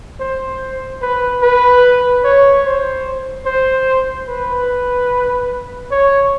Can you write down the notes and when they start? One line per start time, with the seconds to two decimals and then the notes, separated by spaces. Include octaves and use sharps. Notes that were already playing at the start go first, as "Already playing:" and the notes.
0.20 C5
1.02 B4
1.43 B4
2.24 C#5
2.65 C5
3.46 C5
4.28 B4
5.91 C#5